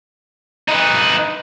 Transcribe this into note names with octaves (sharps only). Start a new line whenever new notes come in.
D#4 B4